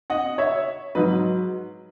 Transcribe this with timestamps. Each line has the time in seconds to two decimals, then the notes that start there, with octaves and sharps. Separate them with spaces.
0.10 D#5 F#5
0.38 C#5 E5
0.95 G#2 F#3 B4 D#5